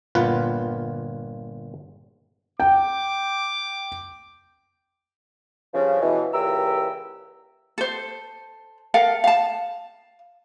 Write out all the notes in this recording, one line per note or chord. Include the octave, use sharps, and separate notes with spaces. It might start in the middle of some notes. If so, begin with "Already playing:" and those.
G1 A#2 F4 B4 F#5
G5 D6
G2 C#3 F3
B2 E3
C#2 A#2 E3 G4 A#5 E6
A4 C5
A4 A#4 F5
F5 A5